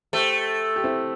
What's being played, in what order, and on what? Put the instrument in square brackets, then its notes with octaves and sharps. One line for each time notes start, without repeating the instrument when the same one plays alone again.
[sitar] A3 [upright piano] G4 C5
[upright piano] G4
C4 E4